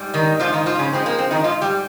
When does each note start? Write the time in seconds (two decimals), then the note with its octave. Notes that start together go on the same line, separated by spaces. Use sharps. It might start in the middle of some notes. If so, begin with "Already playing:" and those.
Already playing: G#2 G3
0.14 D#3 D#4
0.40 G#2 F3 F4
0.53 D#3 D#4
0.66 F3 F4
0.79 C#3 C#4
0.92 G#2 F3 G#3 C4
1.06 A#3
1.19 C4
1.31 D#3 D#4
1.44 G#2 F3 F4
1.61 G3 G4